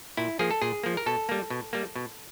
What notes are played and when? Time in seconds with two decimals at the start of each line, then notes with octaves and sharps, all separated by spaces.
0.17 A#2 E4
0.39 F3 A#3 G#4
0.51 A4
0.61 A#2 G#4
0.83 F3 A#3
0.97 A#4
1.06 B2 A4
1.29 G3 A#3
1.50 B2
1.73 G3 A#3
1.96 B2